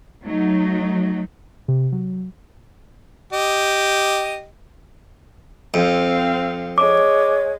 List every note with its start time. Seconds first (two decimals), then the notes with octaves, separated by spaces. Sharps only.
0.24 F#3 A3 D#4
1.68 C3
1.92 F#3
3.33 G4 D#5
5.74 F2 C4 F5
6.78 G#3 C#5 D6